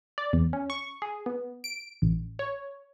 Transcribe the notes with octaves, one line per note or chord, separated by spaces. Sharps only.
D5
E2
C#4
C#6
G#4
B3
D7
A1
C#5